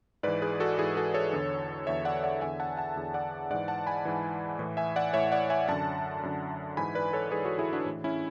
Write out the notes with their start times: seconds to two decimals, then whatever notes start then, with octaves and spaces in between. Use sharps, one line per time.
0.23 G#2 E3 B4 D5
0.42 G#4 B4
0.60 F#4 A4
0.78 G#2 E3 E4 G#4
0.97 F#4 A4
1.14 A4 C#5
1.33 E2 D3
1.87 E2 D3 C#5 E5
2.05 D5 F#5
2.23 D5 F#5
2.41 E2 D3 E5 G#5
2.60 F#5 A5
2.77 F#5 A5
2.96 E2 D3
3.14 D5 F#5
3.50 G#2 E3 D5 F#5
3.68 F#5 A5
3.87 G#5 B5
4.05 G#2 E3
4.59 A2 E3
4.77 E5 G#5
4.96 D5 F#5
5.13 A2 E3 C#5 E5
5.32 D5 F#5
5.50 E5 G#5
5.68 F#2 D3 F#5 A5
6.23 F#2 D3
6.77 G#2 E3 G#5 B5
6.95 B4 D5
7.13 A4 C#5
7.31 G#2 E3 G#4 B4
7.45 F#4 A4
7.59 E4 G#4
7.73 D4 F#4
7.86 A2 E3
8.04 C#4 E4